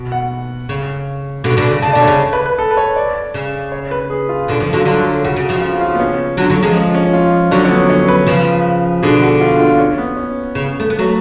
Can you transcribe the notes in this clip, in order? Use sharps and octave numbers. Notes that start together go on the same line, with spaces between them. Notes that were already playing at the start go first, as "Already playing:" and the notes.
Already playing: B2
F#5
C#3
B2 D3
B2 D3
C#3
C#3 A5
B2 D3 D5
C#5
C#3
B4
B4
A4
B4
C#5
D5
C#3
C#5
B4
G#4
F4
B2 D3
C#3 F3
D3 F#3 F4
D3 F#3 D4
C#3 F#4
C#3
C#3 F3
F#4
F4
F4
B3
C#4
D3 F#3
D3 F#3
F3 G#3
C#4
C#4
F4
D3 F#3 D4
C#4
B3
C#4
B4
C#3 F3
B2 D3 G#4
F#4
F4
F4
C#4
B3
C#4
C#3
A3
B3
F#3 A3